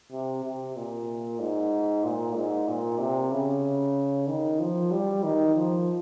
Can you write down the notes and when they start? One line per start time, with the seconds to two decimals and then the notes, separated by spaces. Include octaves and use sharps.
0.12 C3
0.44 C3
0.76 A#2
1.40 G#2
2.04 A#2
2.36 G#2
2.68 A#2
3.00 C3
3.32 C#3
4.28 D#3
4.60 F3
4.91 G3
5.23 D#3
5.56 F3